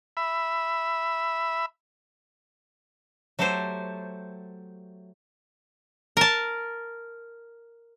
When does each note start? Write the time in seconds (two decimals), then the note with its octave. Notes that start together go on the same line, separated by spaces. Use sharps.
0.17 E5 B5
3.39 F#3 A3 G4 A4 C5
6.17 A#4 A5